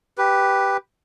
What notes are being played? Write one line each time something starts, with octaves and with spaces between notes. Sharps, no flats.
G4 B4